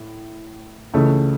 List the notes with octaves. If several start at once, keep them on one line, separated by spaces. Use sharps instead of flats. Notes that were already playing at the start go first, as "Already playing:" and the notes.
Already playing: A2
C#2 C#3 E3 A3